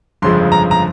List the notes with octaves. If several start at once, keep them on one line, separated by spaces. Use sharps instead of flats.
G1 F2 C#3 F3 G#3 C6
A#5
A#5